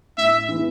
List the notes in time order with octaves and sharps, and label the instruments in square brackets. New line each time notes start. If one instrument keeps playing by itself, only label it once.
[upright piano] A2 [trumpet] E5
[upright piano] E3 B3